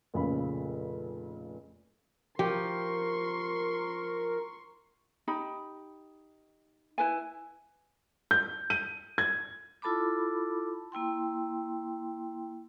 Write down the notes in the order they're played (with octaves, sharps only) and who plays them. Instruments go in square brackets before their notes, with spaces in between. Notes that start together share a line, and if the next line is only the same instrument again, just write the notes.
[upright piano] F1 A#2 C#3 B5
[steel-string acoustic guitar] F3 [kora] G4 [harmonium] A#4 [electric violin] C6 C#6
[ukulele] D#4 G4 B5
E4 B4 G#5
[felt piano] G6
D#7
G#6
[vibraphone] E4 F4 A4 A5 B5 D6
A#3 E4 G5 C6